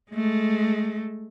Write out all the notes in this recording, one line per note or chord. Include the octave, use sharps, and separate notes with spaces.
G#3 A3